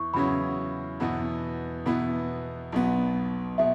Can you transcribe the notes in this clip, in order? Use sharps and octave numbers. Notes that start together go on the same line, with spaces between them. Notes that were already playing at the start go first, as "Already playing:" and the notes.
Already playing: E2 E4 C#6
E2 C#3 F#3 C#4 E4 B5
E2 B2 B3 E4
E2 B2 B3 E4 B5
B1 B2 B3
B2 E5